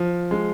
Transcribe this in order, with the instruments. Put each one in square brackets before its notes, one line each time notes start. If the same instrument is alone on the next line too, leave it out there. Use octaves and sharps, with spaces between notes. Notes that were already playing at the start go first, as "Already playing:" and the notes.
Already playing: [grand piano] F3
G#3